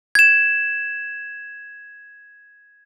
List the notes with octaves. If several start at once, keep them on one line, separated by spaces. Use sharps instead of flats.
G#6 E7